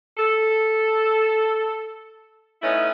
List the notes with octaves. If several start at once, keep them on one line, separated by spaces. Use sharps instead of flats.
A4
A3 B3 C#4 D#4 E4